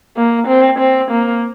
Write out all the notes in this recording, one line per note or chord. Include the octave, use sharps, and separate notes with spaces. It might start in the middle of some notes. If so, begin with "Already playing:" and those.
A#3
C4
C4
A#3